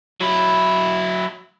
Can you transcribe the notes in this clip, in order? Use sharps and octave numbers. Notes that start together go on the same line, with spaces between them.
F#3 E4